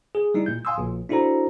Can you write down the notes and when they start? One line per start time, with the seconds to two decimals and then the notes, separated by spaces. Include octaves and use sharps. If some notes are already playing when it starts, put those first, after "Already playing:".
0.15 G#4
0.34 G3 D#4 E4
0.46 A#2 G6
0.65 F5 G#5 C6 D#6 E6
0.78 A#1 A#2
1.09 D4 E4 F#4 A4 C5 A#5